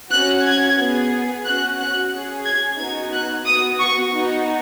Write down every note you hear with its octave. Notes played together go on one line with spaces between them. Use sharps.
C#4 F#4 F#6
G#6
B3 G#4
C#4 F#4 F#6
F#6
C#4 G#4
G#6
B3 D#4 F#4 G#6
F#6
B3 F#4 D#6
C#6
B3 D#4 F#4